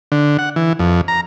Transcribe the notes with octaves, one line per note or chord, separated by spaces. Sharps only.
D3
F#5
E3
F2
A#5